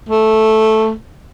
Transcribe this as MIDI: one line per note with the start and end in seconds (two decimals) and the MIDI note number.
0.09 0.92 57